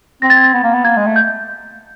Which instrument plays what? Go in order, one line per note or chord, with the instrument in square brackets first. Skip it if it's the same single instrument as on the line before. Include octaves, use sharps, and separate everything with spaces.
[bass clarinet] C4 [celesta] A#6
[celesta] A6
G#6
A6
[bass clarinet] B3
A#3
B3
[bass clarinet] A#3 [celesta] G#6
[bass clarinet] G#3
A3
[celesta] G6